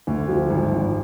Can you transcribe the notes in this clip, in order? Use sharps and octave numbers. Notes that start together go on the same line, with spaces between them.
D2
F3
G#1
G#1